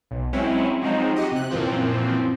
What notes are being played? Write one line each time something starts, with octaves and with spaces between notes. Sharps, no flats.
B1
F#3 G#3 C4 C#4 E4
F3 F#3 G#3 C4 D#4
F#4 G4 D#5
C3 F#6
F#2 A#2 E3 F3 C4